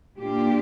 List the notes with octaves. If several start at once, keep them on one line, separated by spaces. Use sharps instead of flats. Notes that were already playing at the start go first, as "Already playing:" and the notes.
A#2 A#3 D4 F4 G4